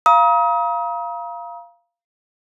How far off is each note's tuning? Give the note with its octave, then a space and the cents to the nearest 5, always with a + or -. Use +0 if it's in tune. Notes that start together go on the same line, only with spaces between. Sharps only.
F5 -15 A#5 +35 D#6 +35